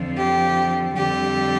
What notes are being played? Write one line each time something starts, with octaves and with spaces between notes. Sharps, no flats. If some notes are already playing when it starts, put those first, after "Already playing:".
Already playing: F2 D3 F3
G4
F2 D3 G3 G4